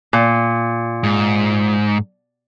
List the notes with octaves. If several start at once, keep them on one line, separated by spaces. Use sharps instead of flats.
A#2
G#2